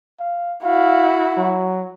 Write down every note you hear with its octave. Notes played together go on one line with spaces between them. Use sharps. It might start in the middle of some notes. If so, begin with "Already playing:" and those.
F5
E4 F#4 F5
F#3